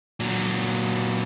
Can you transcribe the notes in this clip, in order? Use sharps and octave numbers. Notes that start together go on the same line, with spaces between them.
A#2 F#3